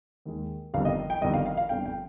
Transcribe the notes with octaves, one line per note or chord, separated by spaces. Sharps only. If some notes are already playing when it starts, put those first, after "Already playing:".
D#2 D#3 G#3
G1 F2 D#3 G3 F5
D#5
G5
G1 F2 D#3 G3 D#5
F5
F5
F5
G1 F2 D3 G3 G5
G5